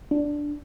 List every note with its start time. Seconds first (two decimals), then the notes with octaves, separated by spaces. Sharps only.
0.11 D4